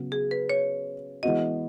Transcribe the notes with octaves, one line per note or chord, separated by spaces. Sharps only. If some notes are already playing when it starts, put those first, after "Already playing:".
Already playing: C#3 F#3 B3
G#4
B4
C#5
E3 G#3 B3 F#4 D#5